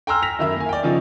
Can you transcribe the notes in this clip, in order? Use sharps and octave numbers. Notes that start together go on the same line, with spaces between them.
G5 G#5 A#5 C6 E6 F6
A#6 B6 F7
F#2 D#3 E4 E5
A#3 G#5
D5 G5
C#3 F3 D#4